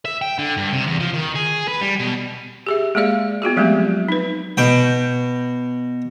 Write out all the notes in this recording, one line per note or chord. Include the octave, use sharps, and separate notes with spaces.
E5
G5
D3
G2
C3
E2
F3
D#3
G#4
B4
G3
B2
G4 G#4 E5
G#3 A#3 G#4 D5 F5
B3 F4 F#4 G#4
F3 F#3 G#3 A3 C4 G4
D#4 B4
B2 G5